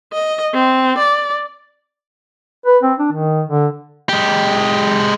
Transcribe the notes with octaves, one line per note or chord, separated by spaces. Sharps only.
D#5
C4
D5
B4
C4
D4
D#3
D3
G#3 G4